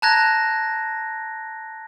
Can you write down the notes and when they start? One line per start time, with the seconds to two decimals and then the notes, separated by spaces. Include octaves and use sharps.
0.02 A5 A#5 F#6 G#6 A#6